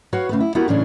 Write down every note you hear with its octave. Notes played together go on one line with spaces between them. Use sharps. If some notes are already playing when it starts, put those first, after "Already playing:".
F#4 B4 C#5 F5 F#5
C#3 A3 B4
E4
B3 E4 F#4 G4 A#4 F#5
A2 C#3 E3 C#4 D4